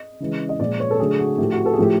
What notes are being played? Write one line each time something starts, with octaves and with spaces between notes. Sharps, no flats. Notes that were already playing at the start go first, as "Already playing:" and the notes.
Already playing: D#5
C#3 E3 G#3
D#5
A#2 F3 G#3 D5
C#5
A4
D3 F#3 A3 G#4
F#4
A2 F3 A3 G4
F#4
A4
G#4
A2 F3 A3 G4